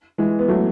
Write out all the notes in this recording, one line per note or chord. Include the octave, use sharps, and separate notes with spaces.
E3 G#3
B3
F#3 A3